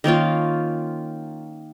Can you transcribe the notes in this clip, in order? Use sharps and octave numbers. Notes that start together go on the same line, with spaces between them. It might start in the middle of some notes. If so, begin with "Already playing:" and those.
D#3 A#3 C#4 F4